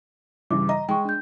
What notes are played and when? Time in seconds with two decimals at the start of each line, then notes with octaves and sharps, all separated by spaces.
0.51 G2 C#3 E3 D6
0.69 D#5 A#5
0.89 G#3 G5 C#6
1.05 D4 G6